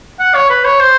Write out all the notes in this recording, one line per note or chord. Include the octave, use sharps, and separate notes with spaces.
F#5
C#5
B4
C#5
C5